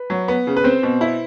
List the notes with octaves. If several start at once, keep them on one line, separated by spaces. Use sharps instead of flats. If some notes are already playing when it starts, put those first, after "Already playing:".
Already playing: B4
F#3
B3
C#3
B4
C4 C5
B2
E4